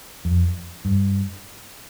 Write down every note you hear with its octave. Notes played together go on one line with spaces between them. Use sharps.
F2
G2